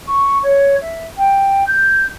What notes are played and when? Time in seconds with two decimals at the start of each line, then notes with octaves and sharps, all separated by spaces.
0.08 C#6
0.43 C#5
0.82 E5
1.18 G5
1.67 G6